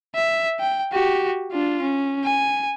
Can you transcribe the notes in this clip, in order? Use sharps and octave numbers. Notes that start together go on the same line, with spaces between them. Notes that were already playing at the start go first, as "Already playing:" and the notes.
E5
G5
F#4 G4
D4 F4
C#4
G#5